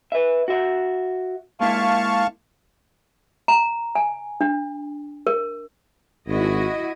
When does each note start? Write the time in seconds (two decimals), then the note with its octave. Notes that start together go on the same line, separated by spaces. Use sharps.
0.12 B4 E5
0.48 F#4 E5
1.61 G#3 A#3 E4 F5 A5 C#6
3.48 A#5
3.95 G#5
4.41 D4
5.27 A#4
6.28 G#1 E4 F#4 D#5